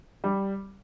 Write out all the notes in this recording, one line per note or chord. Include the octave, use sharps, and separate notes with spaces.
G3